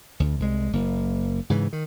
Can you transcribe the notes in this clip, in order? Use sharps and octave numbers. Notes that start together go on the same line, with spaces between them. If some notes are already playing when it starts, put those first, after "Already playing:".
D2
C2 G#3
F#1 A#3
G#2 C#3 E3
D#3